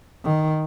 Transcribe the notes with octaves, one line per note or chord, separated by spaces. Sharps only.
D#3